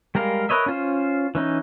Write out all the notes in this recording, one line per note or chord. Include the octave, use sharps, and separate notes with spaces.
G3 G#3 A#4 F5
A#4 B4 C#5 D#5 E5
C#4 F4 C5
E3 C#4 D#4